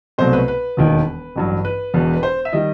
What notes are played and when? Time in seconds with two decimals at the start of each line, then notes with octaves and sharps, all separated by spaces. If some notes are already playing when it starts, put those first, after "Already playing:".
0.18 C2 B2 F#3 A3 C5
0.33 B4
0.48 B4
0.77 E1 D#2 D#3
1.36 A1 G2 F#3
1.65 B4
1.94 E1 E2 B2
2.13 B4
2.23 C5
2.45 E5
2.53 D#3 G3 D#5